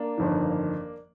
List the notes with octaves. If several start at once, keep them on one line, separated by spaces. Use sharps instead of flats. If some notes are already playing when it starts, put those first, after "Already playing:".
Already playing: A#3 D4
G1 F2 D#3